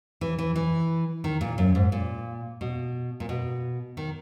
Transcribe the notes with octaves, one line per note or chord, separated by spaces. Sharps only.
E3
E3
E3
D#3
A#2
F#2
G#2
A#2
B2
A#2
B2
D#3